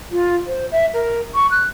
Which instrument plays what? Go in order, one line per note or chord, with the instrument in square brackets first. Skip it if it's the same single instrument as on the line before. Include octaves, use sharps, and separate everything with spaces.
[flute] F4
C5
E5
A#4
C#6
F#6